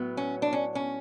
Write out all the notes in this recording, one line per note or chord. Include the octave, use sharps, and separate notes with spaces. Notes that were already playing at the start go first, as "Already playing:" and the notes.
Already playing: A2 F#3 B3
C#4
D4
C#4
C#4